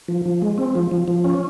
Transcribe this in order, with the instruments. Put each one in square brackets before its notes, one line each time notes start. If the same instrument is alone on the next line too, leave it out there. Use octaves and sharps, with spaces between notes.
[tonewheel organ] F3
F3
G#3
C4
F3
F3
F3
C#4